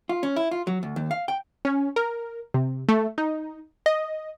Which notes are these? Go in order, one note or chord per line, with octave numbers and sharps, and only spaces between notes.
F4
C#4
E4
F4
F#3
D2
D#2
F5
G5
C#4
A#4
C3
A3
D#4
D#5